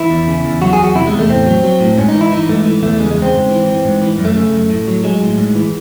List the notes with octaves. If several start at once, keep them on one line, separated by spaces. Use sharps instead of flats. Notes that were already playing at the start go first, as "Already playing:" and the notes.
Already playing: E3 E4
E2
C#3
E2
F#3 F#4
G#4
E2
F#4
C3 E4
G#3
E2
A3
A2 C4
F#3
F#3
A2
G#2 C#4
D#4
E3
E4
E3 D#4
G#2 A3
E3
E2 A3
C#3 G#3
G#3
E2
C4
G#2
E3
E3
G#2
E3
F#2
A3
C#3 A3
F#2
A2
F#3
F#3 G#3
A2
G#2
E3